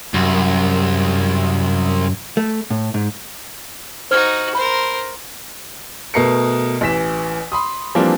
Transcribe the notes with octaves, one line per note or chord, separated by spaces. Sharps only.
C2 F#2
A3
A2
G#2
D#4 F#4 C5 F6 G#6
A#4 C5 B5
B2 A3 A#4 C7 C#7
A1 E3 B6 E7
B5 C6 D#6
E3 F3 G3 A#3 C4 D4